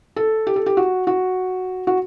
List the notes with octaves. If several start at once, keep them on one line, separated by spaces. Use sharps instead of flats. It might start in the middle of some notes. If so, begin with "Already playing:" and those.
A4
G4
A4
G4
F#4
F#4
F#4